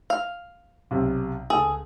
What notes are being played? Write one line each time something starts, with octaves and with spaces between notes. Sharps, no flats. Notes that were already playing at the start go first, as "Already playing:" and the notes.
F5
B1 C3
C#2 G#4 A4